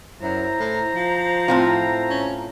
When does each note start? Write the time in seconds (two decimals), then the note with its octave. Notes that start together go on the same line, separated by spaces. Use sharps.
0.22 F#2 E4 C5 A#5
0.59 A2
0.96 F3
1.48 A2 C4 E4 F4
2.10 C#4